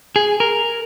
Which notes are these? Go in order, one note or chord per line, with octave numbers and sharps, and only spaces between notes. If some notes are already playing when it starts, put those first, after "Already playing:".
G#4
A#4